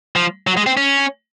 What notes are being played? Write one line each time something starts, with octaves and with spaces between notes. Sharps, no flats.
F3
F#3
G#3
C4
C#4